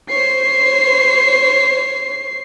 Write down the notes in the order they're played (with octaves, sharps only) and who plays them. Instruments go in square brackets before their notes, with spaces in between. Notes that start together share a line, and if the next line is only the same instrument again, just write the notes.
[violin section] C5 C#5 [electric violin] C7